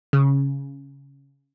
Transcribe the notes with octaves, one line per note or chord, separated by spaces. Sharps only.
C#3